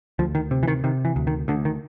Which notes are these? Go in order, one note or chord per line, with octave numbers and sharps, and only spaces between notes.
D2 F3
D#3
C3
E3
D#3
C3 D#3
E3
D2
D#3
D2 D3
D#3